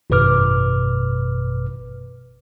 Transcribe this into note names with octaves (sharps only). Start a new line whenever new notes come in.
G#1 F#2 B2 B4 D6 F6